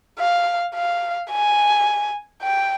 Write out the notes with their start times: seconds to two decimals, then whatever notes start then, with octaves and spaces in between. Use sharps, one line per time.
0.19 F5
0.75 F5
1.31 G#5
2.43 G5